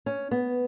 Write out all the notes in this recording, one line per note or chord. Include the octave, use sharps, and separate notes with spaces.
C#4
B3